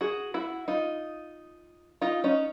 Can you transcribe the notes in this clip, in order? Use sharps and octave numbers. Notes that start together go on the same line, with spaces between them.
F#4 G#4
E4 F#4
D#4 F4
D#4 F4
C#4 D#4